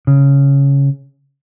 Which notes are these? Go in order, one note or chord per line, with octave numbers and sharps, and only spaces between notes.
C#3